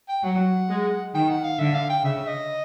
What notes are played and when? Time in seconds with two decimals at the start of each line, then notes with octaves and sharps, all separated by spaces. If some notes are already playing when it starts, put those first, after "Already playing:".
0.09 G5
0.23 F#3 F#5
0.69 G#3
1.14 D#3 G5
1.30 F#5
1.44 F5
1.59 D3 E5
1.75 F5
1.90 G5
2.04 C#3 E5
2.27 D#5